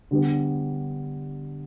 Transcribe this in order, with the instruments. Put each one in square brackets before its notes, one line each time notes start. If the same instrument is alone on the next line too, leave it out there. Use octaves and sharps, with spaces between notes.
[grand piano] D3 G3 B3